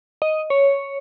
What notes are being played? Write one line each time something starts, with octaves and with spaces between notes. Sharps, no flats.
D#5
C#5